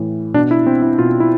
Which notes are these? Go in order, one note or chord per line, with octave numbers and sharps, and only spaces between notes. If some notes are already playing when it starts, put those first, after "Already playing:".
Already playing: A2 E3
B2 D4
E4
C4
E4
B2 F4
E4